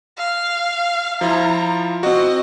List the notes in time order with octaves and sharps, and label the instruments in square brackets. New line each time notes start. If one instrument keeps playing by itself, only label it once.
[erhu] F5
[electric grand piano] F3 E4 F4 [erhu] A#5
[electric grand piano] C4 F#4 [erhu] D#5